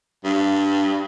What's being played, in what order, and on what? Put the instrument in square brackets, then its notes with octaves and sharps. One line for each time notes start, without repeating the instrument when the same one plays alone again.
[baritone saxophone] G2